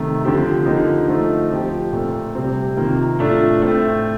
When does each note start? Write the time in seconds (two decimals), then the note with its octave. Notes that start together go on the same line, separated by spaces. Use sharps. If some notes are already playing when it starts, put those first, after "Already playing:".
Already playing: C3 D#3 A3
0.24 D3 F3 C4 G4
0.66 D3 F3 A#3 D#4 G4
1.08 D3 F3 A3 D#4
1.50 F3 C4 G4
1.92 A#2 A3 C4
2.35 C3 G3 C4
2.77 C3 D#3 A#3 F4
3.19 A2 A3 D4 F4
3.60 A2 A3 C4